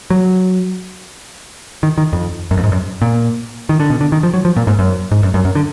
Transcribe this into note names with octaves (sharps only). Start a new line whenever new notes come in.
F#3
D#3
D#3
F2
F#2
F2
G#2
F#2
A#2
D#3
D3
B2
D3
D#3
F3
F#3
F3
A#2
G#2
F#2
G#2
F#2
F#2
F#2
D3